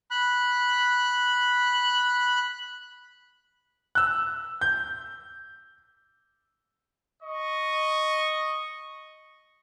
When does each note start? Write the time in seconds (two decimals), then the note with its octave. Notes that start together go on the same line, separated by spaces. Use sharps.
0.11 B5 F#6
3.95 E6 F#6
4.61 G6
7.23 D#5 C#6